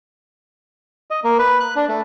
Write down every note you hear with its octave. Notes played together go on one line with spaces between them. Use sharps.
D#5
A#3
B4
F#6
D4
A3